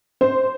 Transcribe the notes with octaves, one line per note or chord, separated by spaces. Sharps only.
C5